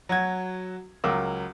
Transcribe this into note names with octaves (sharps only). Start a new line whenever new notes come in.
F#3 F#4 G#6
C#2 F#3 A#4 D6 E6